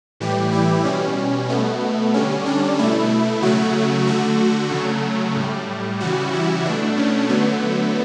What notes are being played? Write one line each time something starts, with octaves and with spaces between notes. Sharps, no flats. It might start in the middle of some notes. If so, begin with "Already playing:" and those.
A2 E3 G3 G4
E4
B2 G3 C#4
B2 A3 B3
D3 G3 C#4
D4
B2 A3 E4
C#3 F#3 A3 F#4
D3 A3 F#4
C#3 F#3 A3
A2 G3
C#3 E3 G3 F#4
E4
B2 A3 D4
C#4
D3 F#3 A3 B3